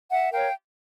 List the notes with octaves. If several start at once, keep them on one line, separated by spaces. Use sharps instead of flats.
E5 F#5
A#4 C#5 F5 G5